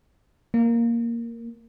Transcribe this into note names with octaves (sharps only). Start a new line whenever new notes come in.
A#3